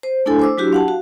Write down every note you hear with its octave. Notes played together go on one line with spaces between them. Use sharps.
C5
A3 D4 E4 A4 G#5
C5 D6 E6
F#3 D4 E4 F#4 G4
F5 F#5 A5
F#4